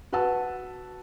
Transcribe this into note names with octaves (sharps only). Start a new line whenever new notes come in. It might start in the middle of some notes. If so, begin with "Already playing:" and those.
F#4 B4 F#5 A5 E6